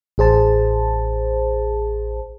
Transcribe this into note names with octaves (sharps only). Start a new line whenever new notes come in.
A1 G#4 C5 A5